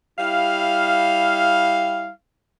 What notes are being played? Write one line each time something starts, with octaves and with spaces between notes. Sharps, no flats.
G3 E4 F5